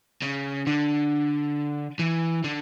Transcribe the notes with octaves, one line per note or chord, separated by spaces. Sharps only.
C#3
D3
E3
D3